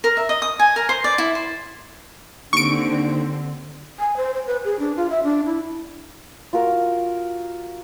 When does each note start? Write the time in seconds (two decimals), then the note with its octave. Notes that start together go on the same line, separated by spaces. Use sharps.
0.04 A#4
0.17 E5
0.29 D#5
0.42 D#6
0.59 G#5
0.76 A#4
0.89 C5
1.04 D5
1.18 E4
1.35 C5
2.53 D#2 D3 C4 C#6 D7
3.99 G#5
4.17 C5
4.34 C5
4.47 B4
4.64 G#4
4.79 D4
4.96 F4
5.10 E5
5.23 D4
5.45 E4
6.53 F4 F#4 A#4